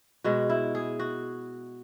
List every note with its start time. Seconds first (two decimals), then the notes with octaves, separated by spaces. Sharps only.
0.24 B2 G#3 F#4
0.49 E4
0.75 G#4
0.99 F#4